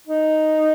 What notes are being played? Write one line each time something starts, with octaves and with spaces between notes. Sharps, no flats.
D#4